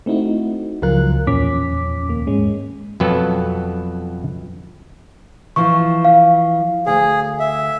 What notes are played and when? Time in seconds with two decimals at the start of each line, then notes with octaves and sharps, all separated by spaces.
0.06 A3 C4 D#4 E4 F#4
0.82 C#2 F3 F#3 F4 A#4 F#6
1.27 E2 A#2 F3 C#4 D6 B6
2.09 D#2 A#3
2.27 G#2 G#3 C#4
3.00 F2 B2 F#3 B3 A4
5.56 E3 F3 C#6
6.05 F5
6.86 D2 G#4
7.40 E5